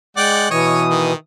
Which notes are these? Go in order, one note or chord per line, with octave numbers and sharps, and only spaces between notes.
G#3 D5 F#5 G5
B2 E3 C#5 D#5 D#6
D#3